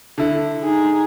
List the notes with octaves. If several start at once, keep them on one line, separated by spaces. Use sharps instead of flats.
D3 E4
D#4 G#4